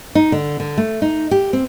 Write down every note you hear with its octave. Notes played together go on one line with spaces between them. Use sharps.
D#4
D3
D3
A3
D#4
G4
C4